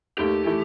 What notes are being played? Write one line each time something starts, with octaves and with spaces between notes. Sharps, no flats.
D#2 D#3 A3 G4
E3 A3 E4